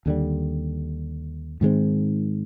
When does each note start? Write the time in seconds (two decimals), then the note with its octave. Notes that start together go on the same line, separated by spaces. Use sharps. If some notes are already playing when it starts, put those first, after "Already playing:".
0.06 D#2 D3 G3
1.61 G#2 D#3 G#3 C4